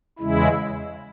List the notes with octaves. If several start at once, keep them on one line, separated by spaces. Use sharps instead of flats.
E2 C#3 G#3 E4